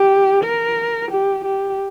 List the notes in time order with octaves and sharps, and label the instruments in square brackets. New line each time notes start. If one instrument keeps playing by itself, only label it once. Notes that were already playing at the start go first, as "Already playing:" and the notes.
Already playing: [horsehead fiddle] G4
A#4
G4
G4